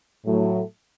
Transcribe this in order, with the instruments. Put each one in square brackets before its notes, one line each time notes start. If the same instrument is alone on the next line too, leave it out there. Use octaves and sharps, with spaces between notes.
[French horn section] A2 F#3 A3